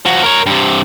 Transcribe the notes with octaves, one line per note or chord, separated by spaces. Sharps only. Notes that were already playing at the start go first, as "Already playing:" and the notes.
F3 F#4
A#4 C#5
G2 C3